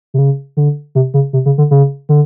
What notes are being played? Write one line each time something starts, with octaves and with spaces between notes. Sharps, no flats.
C3
C#3
D3
C3
C#3
C3
C#3
D3
C#3
D3